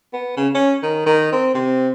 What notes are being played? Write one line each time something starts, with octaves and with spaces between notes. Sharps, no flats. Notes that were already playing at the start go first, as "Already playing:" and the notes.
B3
C#3
C#4
D#3
D#3
C4
C3